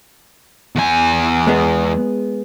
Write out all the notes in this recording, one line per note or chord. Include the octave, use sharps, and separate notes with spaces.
E2 G#5
G#3 B3 G#4